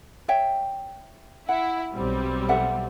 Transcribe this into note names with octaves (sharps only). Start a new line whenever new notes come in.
C#5 E5 G5
E4 F#5
B1 G3 C4
A4 E5 F#5